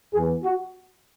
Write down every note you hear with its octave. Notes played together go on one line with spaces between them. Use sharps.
E2 E3 B3 G#4
F#4